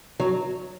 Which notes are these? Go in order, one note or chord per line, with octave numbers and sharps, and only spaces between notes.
F#3